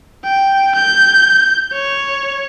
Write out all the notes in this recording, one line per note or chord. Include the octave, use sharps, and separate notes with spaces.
G5
G6
C#5